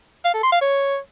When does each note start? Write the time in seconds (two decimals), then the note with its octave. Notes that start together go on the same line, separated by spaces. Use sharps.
0.25 F5
0.34 A4
0.43 C6
0.52 F5
0.61 C#5